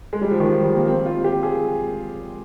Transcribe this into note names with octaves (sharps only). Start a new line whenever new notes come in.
G#3
G3
F3
D#3
F3
G3
A#3
C4
F4
G4
G#4